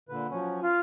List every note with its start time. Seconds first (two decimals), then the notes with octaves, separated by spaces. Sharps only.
0.09 A#2 D3 B4
0.30 F3 F#3 C#4
0.62 F4